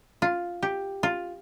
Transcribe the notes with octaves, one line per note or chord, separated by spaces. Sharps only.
F4
G4
F4